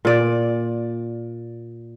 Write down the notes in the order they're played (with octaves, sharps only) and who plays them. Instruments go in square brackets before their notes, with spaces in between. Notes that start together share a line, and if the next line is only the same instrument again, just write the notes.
[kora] A#2 D5